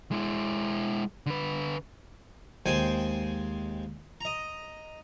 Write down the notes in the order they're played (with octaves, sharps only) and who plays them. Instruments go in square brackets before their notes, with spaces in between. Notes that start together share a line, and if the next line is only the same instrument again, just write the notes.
[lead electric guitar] G#3 E4
D3 B4
[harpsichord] D#2 G#3 C5 G5 G#5
D#5 A#5